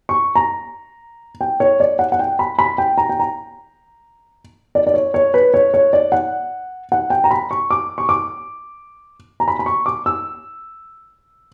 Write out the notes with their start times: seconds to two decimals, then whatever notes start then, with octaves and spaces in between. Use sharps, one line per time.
0.09 C#6
0.35 A#5
1.41 G5
1.60 C#5
1.80 D5
1.99 F#5
2.12 F#5
2.19 G5
2.39 B5
2.59 B5
2.78 G5
2.98 A#5
3.09 G5
3.20 A#5
4.75 D5
4.87 D5
4.94 C#5
5.14 C#5
5.34 B4
5.54 C#5
5.74 C#5
5.93 D5
6.12 F#5
6.92 F#5
7.10 G5
7.24 A#5
7.31 B5
7.51 C#6
7.71 D6
7.98 C#6
8.09 D6
9.40 A#5
9.48 B5
9.59 B5
9.66 C#6
9.86 D6
10.06 E6